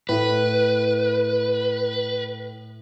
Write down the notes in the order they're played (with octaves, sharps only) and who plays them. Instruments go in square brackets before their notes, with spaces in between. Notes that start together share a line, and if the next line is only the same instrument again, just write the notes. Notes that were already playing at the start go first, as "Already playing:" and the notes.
[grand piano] A2 [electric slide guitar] B4